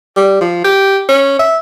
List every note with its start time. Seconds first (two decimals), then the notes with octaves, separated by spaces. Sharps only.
0.16 G3
0.41 F3
0.64 G4
1.09 C#4
1.39 E5